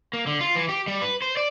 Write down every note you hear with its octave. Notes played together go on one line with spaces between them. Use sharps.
A#3
D3
F4
E3
G4
G3
B4
C5
D5